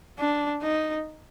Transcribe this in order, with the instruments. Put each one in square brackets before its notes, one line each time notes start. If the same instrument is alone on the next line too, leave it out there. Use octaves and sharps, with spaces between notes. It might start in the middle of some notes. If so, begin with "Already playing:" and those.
[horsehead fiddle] D4
D#4